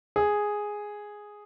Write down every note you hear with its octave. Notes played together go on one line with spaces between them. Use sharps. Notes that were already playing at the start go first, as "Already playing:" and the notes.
G#4